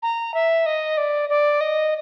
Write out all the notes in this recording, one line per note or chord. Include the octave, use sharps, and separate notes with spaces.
A#5
E5
D#5
D5
D5
D#5